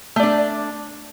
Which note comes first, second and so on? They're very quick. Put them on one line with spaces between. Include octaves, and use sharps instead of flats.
A3 D5 D4